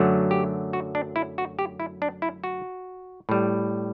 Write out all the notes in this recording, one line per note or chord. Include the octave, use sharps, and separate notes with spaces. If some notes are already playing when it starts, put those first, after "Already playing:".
Already playing: F#2 D3 F#3 A3
G4
F#4
D4
E4
F#4
G4
E4
D4
E4
F#4
A2 G3